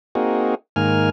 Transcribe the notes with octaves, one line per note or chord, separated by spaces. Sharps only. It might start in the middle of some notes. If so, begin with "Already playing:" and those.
A#3 C4 D#4 F#4 G#4
G#2 D#3 A#3 G#5 F6